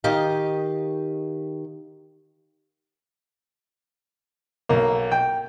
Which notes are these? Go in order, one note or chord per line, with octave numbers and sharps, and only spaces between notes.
D#3 G4 D#5 F5
B1 A#3
G5